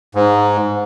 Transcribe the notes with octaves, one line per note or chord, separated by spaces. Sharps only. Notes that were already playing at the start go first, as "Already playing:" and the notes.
G#2